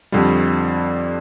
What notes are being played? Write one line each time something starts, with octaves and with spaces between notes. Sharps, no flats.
F2 D3 G3